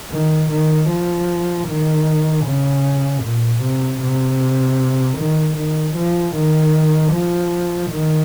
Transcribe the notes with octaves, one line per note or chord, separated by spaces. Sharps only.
D#3
D#3
F3
D#3
C#3
A#2
C3
C3
D#3
D#3
F3
D#3
F3
D#3